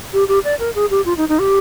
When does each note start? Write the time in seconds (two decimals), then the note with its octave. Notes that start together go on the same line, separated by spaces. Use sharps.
0.13 G4
0.28 G4
0.44 D5
0.59 A#4
0.75 G#4
0.90 G4
1.06 F4
1.17 D#4
1.29 D#4
1.40 G4